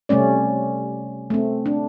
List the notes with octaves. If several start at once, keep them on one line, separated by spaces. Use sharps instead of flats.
C3 G3 A3 C#4 D5
A3 C4
D4